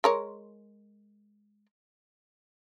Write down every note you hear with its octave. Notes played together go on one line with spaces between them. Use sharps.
G#3 A#4 C#5